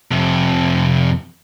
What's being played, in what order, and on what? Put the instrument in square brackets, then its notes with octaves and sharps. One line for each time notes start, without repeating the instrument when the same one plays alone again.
[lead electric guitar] F2 C3